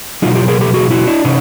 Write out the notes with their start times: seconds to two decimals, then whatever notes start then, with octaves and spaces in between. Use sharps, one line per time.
0.22 B2 F#3 D#4 F4
0.35 F4 G4
0.48 G#4 A#4
0.61 G4 A4
0.74 F#4 G#4
0.90 E4 F#4
1.07 D4 E4
1.25 C3 C#4 D#4